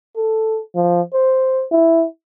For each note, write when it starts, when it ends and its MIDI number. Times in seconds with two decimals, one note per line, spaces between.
0.16 0.60 69
0.75 1.01 53
1.13 1.64 72
1.72 2.04 64